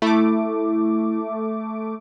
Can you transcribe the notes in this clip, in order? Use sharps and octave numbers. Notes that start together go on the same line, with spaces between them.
A3 E4 D6